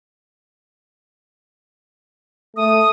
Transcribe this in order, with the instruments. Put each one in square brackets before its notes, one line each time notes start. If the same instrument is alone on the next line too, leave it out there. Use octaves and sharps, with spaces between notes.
[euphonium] A3 [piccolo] D#6